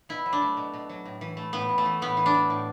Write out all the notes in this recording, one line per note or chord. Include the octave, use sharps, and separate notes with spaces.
B2 E4
F#3
D4
A3
B2
B2
F#3
A2
E3
A3
A2 B3
A2
A3
E3
A2 B3
E3
D4
A3
A2